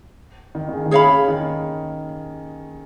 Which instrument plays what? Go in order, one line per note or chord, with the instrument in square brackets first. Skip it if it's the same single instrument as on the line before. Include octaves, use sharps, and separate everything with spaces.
[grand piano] D#3
D#3
C#3
D#3
[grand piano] C#3 [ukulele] G#4 C#5 F5 B5
[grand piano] C#3
D#3